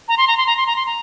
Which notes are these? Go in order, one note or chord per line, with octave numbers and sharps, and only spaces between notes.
A#5
C6
A#5
C6
A#5
C6
A#5
C6
A#5